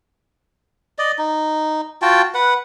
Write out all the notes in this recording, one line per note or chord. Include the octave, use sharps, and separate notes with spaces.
D5 D#5
D#4
F4 F#4 G5 A5
B4 F#5